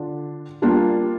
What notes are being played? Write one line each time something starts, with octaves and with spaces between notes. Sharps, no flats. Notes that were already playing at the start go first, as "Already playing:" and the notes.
Already playing: D3 D4 F4
G3 A#3 D4 F4